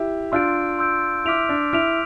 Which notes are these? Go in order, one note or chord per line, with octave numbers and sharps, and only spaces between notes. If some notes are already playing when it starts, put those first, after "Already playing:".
Already playing: E4 G4
D4 F4 C6 E6 G6 D7
C6 E6 G6 D7
E4 D6 F6 B6 D7 F7
D4
E4 D6 F6 B6 D7 F7